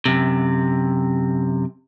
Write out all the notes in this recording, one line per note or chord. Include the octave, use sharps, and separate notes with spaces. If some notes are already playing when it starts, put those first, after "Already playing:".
F#2 C3